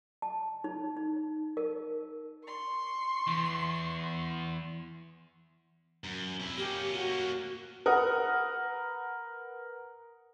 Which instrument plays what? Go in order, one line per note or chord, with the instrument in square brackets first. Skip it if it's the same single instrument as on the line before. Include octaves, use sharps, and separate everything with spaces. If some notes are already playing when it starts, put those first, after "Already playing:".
[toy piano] A5
D#4
D#4
A#4
[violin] C6 C#6
[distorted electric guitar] E2
F#2
F2 E4
[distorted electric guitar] A#3 C#4 [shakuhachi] G4
[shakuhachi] F#4
[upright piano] A#4 B4 F#5 D#6